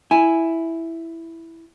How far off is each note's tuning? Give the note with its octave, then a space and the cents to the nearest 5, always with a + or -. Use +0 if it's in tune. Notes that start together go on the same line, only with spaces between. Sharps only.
E4 +0 G#5 +0